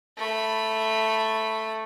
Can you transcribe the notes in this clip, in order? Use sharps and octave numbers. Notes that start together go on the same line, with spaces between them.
A3 B5